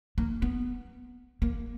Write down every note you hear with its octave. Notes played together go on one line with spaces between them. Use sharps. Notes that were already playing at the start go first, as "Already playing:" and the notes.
A#3
B3
A#3